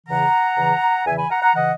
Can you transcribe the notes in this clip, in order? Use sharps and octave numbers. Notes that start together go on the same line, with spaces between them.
E2 C#3 E3 F#5 A#5
E2 C#3 E3
E2 C#3 E3 E5 G#5
G#5 B5
F#5 A#5
F#5 A#5
C#3 E3 D#5 F#5